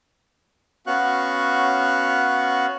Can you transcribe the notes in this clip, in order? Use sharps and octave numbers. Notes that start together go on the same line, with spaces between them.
B3 C#4 F#4 F5 C#6 F#6